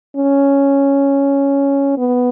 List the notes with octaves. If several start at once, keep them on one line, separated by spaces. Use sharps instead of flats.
C#4
B3